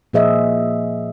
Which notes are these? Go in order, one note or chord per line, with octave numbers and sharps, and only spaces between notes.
A#2 F3 G#4 C5 D#5 E5